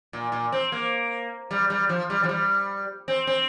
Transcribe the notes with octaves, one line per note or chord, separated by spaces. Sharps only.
A#2
A#2
C4
A#3
G3
G3
F3
G3
F3
G3
C4
C4